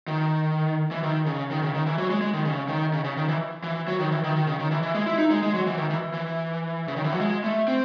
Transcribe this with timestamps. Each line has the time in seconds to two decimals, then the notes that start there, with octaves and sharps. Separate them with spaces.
0.08 D#3
0.91 E3
1.03 D#3
1.26 C#3
1.51 D#3
1.62 C#3
1.75 D#3
1.86 E3
1.98 F#3
2.10 G#3
2.21 G#3
2.34 D#3
2.45 C#3
2.68 D#3
2.93 C#3
3.04 C#3
3.17 D#3
3.28 E3
3.63 E3
3.88 F#3
3.99 D#3
4.12 E3
4.24 D#3
4.36 D#3
4.47 C#3
4.59 D#3
4.71 E3
4.83 E3
4.95 G#3
5.06 E4
5.18 D#4
5.31 G#3
5.43 G#3
5.54 F#3
5.66 E3
5.77 D#3
5.90 E3
6.14 E3
6.88 C#3
6.96 D#3
7.04 E3
7.12 F#3
7.20 G#3
7.44 A3
7.68 C4